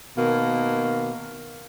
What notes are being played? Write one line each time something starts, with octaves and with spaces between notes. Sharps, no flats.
B2 D#3 A#3